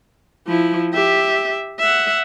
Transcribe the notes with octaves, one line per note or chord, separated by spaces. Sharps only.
F3 E4
G4 E5
E5 F#5